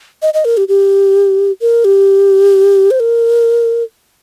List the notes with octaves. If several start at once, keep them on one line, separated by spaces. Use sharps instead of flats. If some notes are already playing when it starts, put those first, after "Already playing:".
D#5
D#5
A#4
G4
G4
A#4
G4
C5
A#4